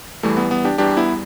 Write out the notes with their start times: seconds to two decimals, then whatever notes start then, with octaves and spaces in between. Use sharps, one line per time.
0.23 E2 E3 G3 A3
0.37 B3
0.51 B3
0.65 D4 G4
0.78 E2 E3 G3 D4 G4
0.97 B3 E4